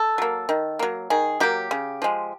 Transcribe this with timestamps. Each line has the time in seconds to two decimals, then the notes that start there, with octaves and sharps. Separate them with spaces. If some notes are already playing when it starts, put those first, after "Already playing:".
Already playing: A4
0.18 F#3 A#3
0.49 D#3
0.79 F#3 A#3
1.10 D#3 G#4
1.40 F#3 A#3 G4
1.71 C#3
2.02 F3 G#3